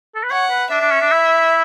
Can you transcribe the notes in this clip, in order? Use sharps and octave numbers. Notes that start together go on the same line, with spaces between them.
A4
B4
C#5 F#5
B4
D4 E5
D4
C#4
D4
E4